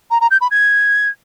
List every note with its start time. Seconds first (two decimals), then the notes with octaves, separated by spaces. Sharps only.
0.11 A#5
0.21 A#5
0.31 G6
0.41 B5
0.51 G#6